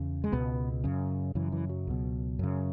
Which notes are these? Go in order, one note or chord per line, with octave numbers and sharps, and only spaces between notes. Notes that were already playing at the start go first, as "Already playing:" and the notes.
Already playing: E2 C#3
G#3
C#2 B2 B3
F#2 C#3
F#2 C#3 E3
E3
F#3
C#2 B2
F#2 C#3